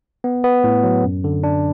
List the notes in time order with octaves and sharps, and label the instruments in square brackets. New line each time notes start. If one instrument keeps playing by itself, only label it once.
[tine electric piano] B3
B3
A2
F#3
F#2
D3
D4